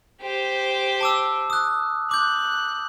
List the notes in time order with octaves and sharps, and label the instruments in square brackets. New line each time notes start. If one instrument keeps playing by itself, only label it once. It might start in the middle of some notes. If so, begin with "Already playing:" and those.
[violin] G4 C5
[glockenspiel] A5 D6 E6
D#6 F#6
[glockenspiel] D6 G6 [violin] F#6